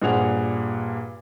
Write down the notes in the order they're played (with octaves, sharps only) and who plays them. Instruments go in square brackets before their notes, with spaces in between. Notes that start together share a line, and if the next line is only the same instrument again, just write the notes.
[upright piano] G2 A#2 G#4 C5 F#5 F7